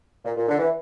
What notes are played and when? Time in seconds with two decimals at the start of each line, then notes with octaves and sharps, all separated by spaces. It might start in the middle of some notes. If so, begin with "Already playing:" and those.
0.25 A#2
0.37 A#2
0.48 D3
0.59 E3